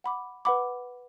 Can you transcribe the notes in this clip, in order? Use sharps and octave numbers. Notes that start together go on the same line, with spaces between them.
F#5 B5 D6
B4 F#5 B5 D6